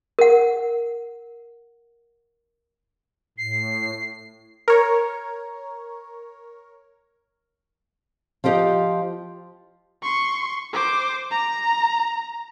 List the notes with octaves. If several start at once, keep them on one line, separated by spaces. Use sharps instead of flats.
A#4 F#5
A2 C7
A#4 C#5
F3 F4 G4 D#5
C6 C#6
C5 D6
A#5